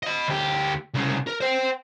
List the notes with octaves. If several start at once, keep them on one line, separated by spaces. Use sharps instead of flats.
D#5 B5
D2 G4
C2 C#3
A#4
C5 G5